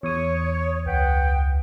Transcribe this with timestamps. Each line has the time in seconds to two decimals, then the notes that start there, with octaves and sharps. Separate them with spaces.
0.03 E2 C#5 D#6
0.86 C#2 B4 F#5 G5